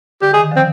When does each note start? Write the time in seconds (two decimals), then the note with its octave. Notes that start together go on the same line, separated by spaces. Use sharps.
0.22 D3 G4
0.34 G#4
0.37 D#3
0.51 D3 F3 C4